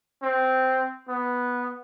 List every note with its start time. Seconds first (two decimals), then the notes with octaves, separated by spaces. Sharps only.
0.23 C4
1.09 B3